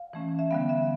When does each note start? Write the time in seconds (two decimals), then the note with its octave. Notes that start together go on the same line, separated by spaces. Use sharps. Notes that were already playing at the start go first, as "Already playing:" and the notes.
Already playing: F5
0.13 E3 A3 C#4
0.39 E5
0.51 D3 G3 B3 F5
0.69 E5